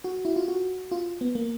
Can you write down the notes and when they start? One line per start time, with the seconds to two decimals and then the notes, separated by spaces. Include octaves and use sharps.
0.04 F#4
0.25 E4
0.36 F4
0.48 F#4
0.91 F4
1.21 B3
1.35 A#3